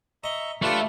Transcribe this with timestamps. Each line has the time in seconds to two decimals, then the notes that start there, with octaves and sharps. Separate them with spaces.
0.24 D#5 E5 A#5 C#6
0.62 A3 D4 F4 G4 B4